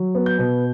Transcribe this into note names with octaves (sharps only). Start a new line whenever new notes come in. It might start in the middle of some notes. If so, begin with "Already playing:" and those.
Already playing: F#3
B3
G6
B2